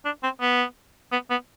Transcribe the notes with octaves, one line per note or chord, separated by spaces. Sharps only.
D4
C4
B3
B3
B3